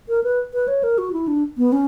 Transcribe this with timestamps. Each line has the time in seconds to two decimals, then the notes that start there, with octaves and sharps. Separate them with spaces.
0.09 A#4
0.24 B4
0.54 B4
0.68 C#5
0.83 A#4
0.98 F#4
1.13 E4
1.28 D4
1.58 B3
1.73 C#4